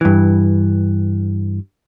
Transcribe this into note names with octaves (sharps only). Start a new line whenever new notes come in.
G2 E3